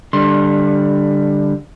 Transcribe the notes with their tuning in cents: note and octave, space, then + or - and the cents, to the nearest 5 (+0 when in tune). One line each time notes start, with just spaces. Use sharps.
D3 +0 G3 +15 C6 +30